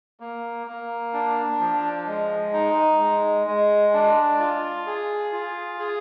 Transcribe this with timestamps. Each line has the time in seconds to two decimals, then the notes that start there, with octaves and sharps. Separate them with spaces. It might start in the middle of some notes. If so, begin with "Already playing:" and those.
0.20 A#3
0.67 A#3
1.14 D4
1.60 F3
2.07 G#3
2.53 D#4
3.00 G#3
3.47 G#3
3.93 D4
4.39 F4
4.86 G#4
5.32 F4
5.79 G#4